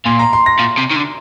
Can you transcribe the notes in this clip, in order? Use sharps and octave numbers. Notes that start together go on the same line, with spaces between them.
A#2 C6
A#5
C6
A#6
A#2
C3
D#3
D3